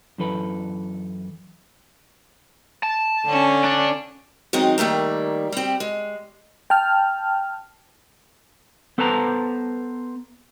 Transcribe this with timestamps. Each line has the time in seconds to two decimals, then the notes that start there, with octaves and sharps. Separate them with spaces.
0.18 F#2 E3 A4 B4
2.83 A5
3.25 D3 C#4
3.64 D4
4.53 D#3 F#3 G#3 C4 D#4
4.78 D#3 G3 A3 A#3
5.52 G3 C4
5.80 G#3
6.70 G5 A5 F6
8.98 B3 A4 B4 C5 A5 A#5